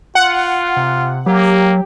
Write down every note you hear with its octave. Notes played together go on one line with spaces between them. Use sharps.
F4 F#5
C3
F#3 A#3 G4